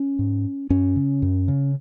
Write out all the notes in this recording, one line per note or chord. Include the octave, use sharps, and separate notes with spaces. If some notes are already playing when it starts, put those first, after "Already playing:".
Already playing: C#4
G#2
F#2 C#4
C#3
F#2
C#3